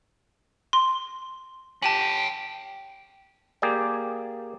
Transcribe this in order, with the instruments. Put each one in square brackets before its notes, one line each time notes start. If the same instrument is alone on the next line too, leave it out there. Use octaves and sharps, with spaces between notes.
[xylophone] C6
[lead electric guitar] C#4 G4 [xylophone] A5 D#7 F#7
[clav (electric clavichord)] A#3 G4 G#4 D5